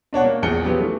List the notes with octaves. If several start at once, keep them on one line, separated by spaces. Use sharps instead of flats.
B2 D4 C#5 F#5
A#3
A#1 E2 G#4 C#7 G7
F3 F#3 B3 G4
E3 A3